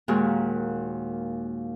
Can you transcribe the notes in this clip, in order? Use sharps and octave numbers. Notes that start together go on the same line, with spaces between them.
D#2 A#2 G#3 F#4